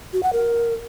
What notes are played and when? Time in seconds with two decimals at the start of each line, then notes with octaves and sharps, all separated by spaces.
0.13 F#4
0.23 F#5
0.33 A#4